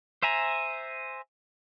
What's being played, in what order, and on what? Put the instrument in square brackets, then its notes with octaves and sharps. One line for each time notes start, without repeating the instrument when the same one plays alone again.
[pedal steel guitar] C5 E5 G#5 A#5